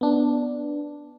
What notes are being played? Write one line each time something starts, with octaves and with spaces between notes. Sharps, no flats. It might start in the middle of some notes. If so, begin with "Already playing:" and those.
B3 D4